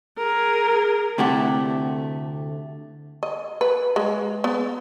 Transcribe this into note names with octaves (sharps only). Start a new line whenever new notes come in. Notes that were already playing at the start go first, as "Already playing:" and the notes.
G#4 A#4
D2 C3 A3 E4 G4 F#5
D#5
B4
G#3
B3